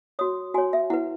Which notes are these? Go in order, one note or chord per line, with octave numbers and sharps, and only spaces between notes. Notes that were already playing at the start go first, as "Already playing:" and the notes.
F#4 C#5 D#6
F#4 C#5 G#5
E5
E4 B4 F#5